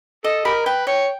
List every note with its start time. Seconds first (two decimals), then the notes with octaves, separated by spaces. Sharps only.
0.24 A4 D#5
0.45 G4 A#4 B5
0.65 B4 G5
0.87 C#5 G5